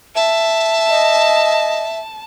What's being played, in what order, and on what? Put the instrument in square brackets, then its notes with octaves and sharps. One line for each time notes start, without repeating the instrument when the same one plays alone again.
[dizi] E5 [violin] A5
[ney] D#5